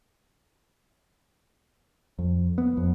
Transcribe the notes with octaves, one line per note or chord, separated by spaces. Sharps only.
F2
B3
F2